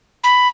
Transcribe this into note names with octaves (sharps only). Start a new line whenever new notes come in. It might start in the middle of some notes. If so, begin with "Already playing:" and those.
B5